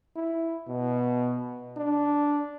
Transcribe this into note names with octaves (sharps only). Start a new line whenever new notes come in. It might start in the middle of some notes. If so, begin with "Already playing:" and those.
E4
B2
D4